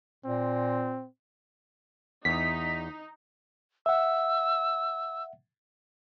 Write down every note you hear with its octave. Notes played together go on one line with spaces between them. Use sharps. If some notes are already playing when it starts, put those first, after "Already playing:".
A#2 C4
E2 D#4 B6
E5 F#5 E6